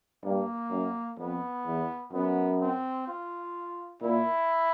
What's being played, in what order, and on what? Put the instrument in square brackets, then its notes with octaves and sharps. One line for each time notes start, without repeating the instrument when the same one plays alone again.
[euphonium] G2 [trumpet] A#3
[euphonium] F#2
[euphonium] F2 [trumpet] B3
[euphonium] E2
[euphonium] F#2 [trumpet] B3
[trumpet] C4
F4
[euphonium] A#2 [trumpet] E4